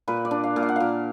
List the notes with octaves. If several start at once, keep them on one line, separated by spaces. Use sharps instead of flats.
A#2 B4
D5
D4
F5
A#2
F5
F#5
A#2 F5